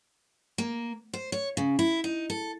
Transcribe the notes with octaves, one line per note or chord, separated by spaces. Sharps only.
A#3
C5
C#5
C#3
E4
D#4
A4